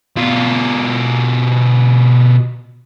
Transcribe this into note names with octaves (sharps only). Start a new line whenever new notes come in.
B2 F4